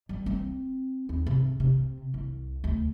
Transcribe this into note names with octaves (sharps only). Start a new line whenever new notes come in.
G3
C4
D#2
C3
C3
C2
D2